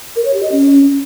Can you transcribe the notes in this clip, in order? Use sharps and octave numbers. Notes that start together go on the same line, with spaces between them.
A#4
C#5
G4
D#5
C#4